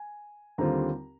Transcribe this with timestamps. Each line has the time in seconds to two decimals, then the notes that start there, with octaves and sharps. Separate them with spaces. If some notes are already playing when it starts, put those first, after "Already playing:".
Already playing: G#5
0.58 D#2 D3 G3 C4 F4 A#5